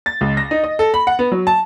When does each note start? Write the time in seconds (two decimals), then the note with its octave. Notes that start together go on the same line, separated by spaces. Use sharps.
0.06 A6
0.21 C#2
0.37 A#6
0.51 D#4
0.64 D#5
0.79 A4
0.94 B5
1.07 F#5
1.19 B3
1.32 F#3
1.47 A5